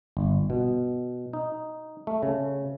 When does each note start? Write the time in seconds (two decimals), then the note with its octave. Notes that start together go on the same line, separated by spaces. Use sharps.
0.17 G1
0.50 B2
1.33 D#4
2.07 A3
2.23 C#3